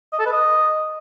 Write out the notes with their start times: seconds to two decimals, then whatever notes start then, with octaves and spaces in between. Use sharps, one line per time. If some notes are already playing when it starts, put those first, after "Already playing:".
0.13 D#5
0.19 A4
0.26 B4
0.32 D#5